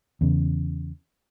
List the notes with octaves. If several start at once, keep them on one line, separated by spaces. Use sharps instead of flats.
E2 C#3